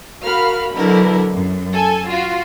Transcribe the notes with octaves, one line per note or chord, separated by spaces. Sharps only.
F#4 A#4 F5 B5 F6
B2 D3 F#3 E4 A#4
F#2
A4 G#5
F4 F#4